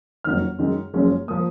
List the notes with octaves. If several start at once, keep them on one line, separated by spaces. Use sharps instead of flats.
F#1 F2 D#3 F#3 F6
F#2 D#3 G#3
F#1 F#2 F3 G#3 C#4
F3 A#3 D#6